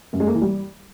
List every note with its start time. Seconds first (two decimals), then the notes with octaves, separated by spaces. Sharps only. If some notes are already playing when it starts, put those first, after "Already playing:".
0.13 F#2
0.20 G#3
0.27 A#3
0.34 E3
0.41 G3